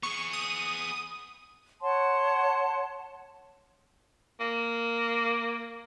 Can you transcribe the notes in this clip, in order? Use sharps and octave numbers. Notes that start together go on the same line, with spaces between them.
B3 G#4 C#6
D#6
C#5 F#5 A5 C6
A#3